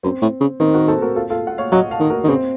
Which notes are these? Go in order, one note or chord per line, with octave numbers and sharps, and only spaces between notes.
F#2 C4
A2
C#3
D#3 C4
F#4 A#4
A4 C5
F#4 A#4
F4 A4
F4 A4
F#5
C#5 F5
F#3 D#5 F#5
F5 A5
D#3
F#4 A#4
D#3
C#3 C4